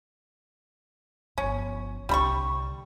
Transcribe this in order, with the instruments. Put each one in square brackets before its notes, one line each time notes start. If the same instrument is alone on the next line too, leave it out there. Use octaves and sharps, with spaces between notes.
[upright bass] G1 F3 [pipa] C#4
[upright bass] C2 D3 [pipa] G3 B5 C#6